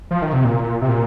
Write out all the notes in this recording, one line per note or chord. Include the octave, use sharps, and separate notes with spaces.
F3
D#3
C3
A#2
C3
A#2